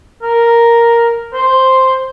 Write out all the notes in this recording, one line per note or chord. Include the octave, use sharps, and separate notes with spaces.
A#4
C5